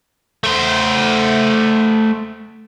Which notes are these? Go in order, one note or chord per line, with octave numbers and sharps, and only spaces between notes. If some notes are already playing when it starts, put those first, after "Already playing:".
A3 C5